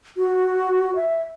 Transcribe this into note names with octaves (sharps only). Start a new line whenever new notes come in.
F#4
E5